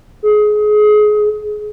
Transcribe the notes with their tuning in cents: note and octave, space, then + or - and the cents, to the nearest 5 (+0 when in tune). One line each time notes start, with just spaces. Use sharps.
G#4 +25